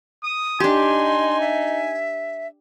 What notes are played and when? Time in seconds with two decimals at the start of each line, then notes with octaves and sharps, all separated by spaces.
0.24 D#6
0.60 D4 D#4 G4 G#5 C6
1.41 E5